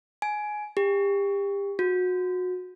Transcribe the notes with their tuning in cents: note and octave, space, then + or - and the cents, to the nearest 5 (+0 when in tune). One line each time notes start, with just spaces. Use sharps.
G#5 +15
G4 +30
F#4 -25